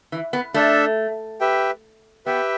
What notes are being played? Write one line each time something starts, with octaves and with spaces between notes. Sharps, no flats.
E3
B3
A3 D4 A4 E5
G4 B4 E5 G5
B3 G4 B4 E5 G5